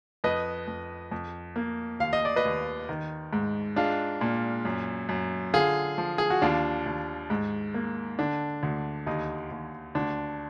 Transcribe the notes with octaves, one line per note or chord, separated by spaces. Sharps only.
F2 B4 D#5
F2
F2
A#3
D#2 F5
D#5
D5
B4 D#5
D#2
D#3
G#2
G#3 D4 F4
A#2
F#2
F#2
D3 F4 G#4
F3
G#4
F#4
D#2 D4 F4
D#2
G#2
A#3
D3 D4
D2
D#2 D#4
D#2
D2 D4